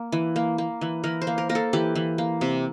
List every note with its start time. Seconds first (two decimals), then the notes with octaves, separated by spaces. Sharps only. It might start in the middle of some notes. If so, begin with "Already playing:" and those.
Already playing: A#3
0.12 E3
0.36 A#3
0.58 A#3
0.81 E3
1.04 E3 A#4
1.22 C5
1.27 A#3
1.38 A#4
1.49 A#3 A#4
1.55 A4
1.73 E3 G4
1.96 E3
2.18 A#3
2.41 C3